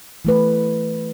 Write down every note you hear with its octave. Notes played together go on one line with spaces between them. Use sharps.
E3 A3 B4